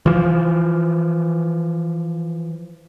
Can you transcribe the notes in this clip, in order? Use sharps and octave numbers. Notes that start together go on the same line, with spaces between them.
E3 F3